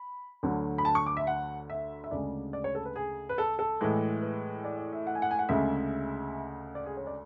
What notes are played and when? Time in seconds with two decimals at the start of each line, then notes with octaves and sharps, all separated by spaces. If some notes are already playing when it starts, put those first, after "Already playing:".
Already playing: B5
0.43 D2 D3 F#3
0.78 B5
0.85 A5
0.95 C#6
1.06 D6
1.17 E5
1.27 F#5
1.70 E5
2.04 E5
2.11 D2 C#3 G#3 D5
2.53 D5
2.64 C#5
2.75 A4
2.85 B4
2.96 G#4
3.29 B4
3.38 A4
3.59 A4
3.81 A2 E3 G#3
4.22 B4
4.64 D5
4.78 D5
4.93 E5
5.07 F#5
5.15 G#5
5.22 F#5
5.31 G#5
5.39 F#5
5.49 D2 C#3 G#3 E5
6.75 D5
6.86 G#4
6.97 C#5
7.07 D5